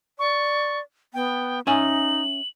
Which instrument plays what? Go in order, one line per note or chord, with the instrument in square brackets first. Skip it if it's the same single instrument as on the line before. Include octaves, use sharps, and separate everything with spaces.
[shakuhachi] D5 [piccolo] C#6
[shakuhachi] B3 [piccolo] G5
[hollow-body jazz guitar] C#4 E5 G#5 [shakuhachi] D#4 [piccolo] F#7